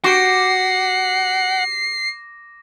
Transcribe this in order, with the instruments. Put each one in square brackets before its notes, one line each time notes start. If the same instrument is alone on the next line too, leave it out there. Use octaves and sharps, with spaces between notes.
[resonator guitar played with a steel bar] F#4 G4 [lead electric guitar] F#5 [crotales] D6 A#6 [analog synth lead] C7